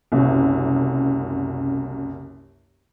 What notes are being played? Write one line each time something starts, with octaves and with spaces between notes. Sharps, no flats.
F#1 C2 F#2